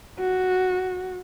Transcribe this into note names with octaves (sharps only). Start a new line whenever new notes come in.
F#4